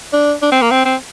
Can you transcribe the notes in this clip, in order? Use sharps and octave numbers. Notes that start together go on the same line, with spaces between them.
D4
D4
C4
A#3
C4
C4